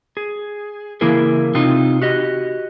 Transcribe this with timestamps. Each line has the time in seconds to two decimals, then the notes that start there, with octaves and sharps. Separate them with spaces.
0.17 G#4
1.01 C#3 E3 A#3 E4 G#4 A#4
1.55 C3 C4 D#4 F4
2.02 F#4 G4 D#5